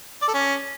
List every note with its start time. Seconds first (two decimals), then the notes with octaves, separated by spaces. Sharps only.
0.22 D5
0.28 A4
0.34 C#4